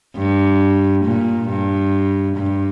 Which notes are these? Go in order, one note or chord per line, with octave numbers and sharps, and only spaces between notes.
G2
A#2
G2
G2